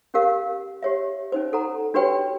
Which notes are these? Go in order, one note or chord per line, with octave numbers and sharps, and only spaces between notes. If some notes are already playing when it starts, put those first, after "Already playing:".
C#4 G4 A#4 F5
G4 C#5 E5
C#4 D#4 C5
D#4 A4 F#5 A#5
D4 F#4 G4 B4 C#5 G5